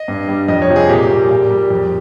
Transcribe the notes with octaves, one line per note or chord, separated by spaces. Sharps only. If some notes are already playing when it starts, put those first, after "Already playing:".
Already playing: D#5
G2
G3
F2 D#5
C#5
C3 F3
G#4
A#2 G4
G3
A#2
G3
F2